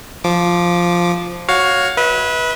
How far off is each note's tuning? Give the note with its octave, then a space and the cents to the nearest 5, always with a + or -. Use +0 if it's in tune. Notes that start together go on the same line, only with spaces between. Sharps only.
F3 +0 D6 +0
F#4 +0 C#5 +0 F5 +15
B4 -15 E5 -45